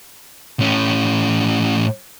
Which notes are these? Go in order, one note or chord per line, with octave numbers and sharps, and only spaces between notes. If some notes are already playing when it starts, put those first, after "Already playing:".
A2 C#4